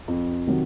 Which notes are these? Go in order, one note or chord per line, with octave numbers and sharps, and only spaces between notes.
F2
C3 D#3 F#3